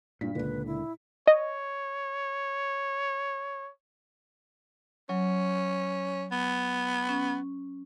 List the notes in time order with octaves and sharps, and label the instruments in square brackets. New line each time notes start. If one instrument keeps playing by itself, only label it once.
[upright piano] G2 B6 [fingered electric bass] A#2
[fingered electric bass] C#2 D3 [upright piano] A#2 [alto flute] B4
[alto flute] E4
[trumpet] C#5 [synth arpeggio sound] D#5
[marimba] F#3 [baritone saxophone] C#4
[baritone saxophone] B3
[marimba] C#4